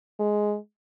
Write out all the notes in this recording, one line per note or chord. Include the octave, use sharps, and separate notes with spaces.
G#3